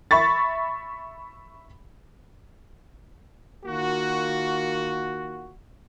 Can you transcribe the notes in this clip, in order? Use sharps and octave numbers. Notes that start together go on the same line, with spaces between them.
E5 B5 C#6 A6
D#3 A#3 F4 F#4